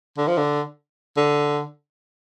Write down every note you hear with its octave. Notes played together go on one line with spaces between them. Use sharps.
D3
F3
D3
D3